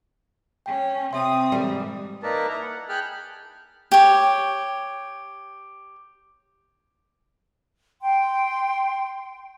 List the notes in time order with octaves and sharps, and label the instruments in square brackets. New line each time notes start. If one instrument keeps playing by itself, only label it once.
[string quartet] C#4 [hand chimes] G5
[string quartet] C3 D#6 [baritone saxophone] C4 [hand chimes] E5 G5 C6
[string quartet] G#2 E3 [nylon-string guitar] G3
[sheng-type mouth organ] A#3 D#4 A#4 B4 D5 A5
E4 A#4 A#5
F#5
G#4 G5 A5 B5 F6 F#6
[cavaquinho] G4 C#5
[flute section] G5 C6